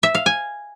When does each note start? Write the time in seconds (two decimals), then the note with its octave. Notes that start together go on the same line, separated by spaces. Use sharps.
0.03 E5
0.15 F5
0.26 G#5